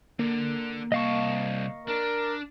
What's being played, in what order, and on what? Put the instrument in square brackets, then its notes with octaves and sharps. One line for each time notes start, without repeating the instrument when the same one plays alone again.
[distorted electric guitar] D3 [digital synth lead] A#3
[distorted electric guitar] C2 A5 [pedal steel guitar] D#5 F5 C#6
[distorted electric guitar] D4 [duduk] A#4